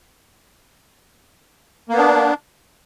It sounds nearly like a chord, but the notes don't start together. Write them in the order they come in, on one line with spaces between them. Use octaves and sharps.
A#3 B3 D4